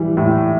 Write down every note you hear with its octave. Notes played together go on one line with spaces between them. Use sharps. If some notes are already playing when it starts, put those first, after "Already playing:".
Already playing: E3 G3
A2